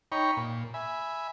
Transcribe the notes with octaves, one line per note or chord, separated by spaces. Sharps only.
D#4 C#5 G5 A#5 B5 C#6
A#2
E5 G#5 B5